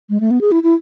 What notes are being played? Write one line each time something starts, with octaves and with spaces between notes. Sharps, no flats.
G#3
A3
B3
G#4
E4
E4